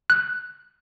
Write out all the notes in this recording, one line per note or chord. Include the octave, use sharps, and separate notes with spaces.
F#6